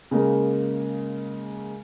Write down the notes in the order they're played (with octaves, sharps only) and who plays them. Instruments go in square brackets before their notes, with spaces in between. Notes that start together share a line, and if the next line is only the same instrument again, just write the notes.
[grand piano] C#3 G#3 A#3 A#4